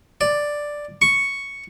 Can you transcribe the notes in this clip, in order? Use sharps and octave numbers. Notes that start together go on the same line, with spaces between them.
D5
C#6